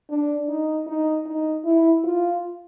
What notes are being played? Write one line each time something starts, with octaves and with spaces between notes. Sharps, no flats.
D4
D#4
D#4
D#4
E4
F4